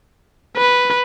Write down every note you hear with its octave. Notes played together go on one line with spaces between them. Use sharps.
B4